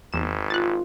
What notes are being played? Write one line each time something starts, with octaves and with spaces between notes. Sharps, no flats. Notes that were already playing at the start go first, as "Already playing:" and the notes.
G#1 E2 E7
F4 F#6 A6